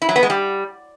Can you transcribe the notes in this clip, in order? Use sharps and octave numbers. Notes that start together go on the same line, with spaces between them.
E4
F#3
B3
G#3
G3